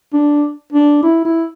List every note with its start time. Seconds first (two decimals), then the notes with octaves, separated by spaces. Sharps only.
0.13 D4
0.73 D4
1.03 E4
1.25 E4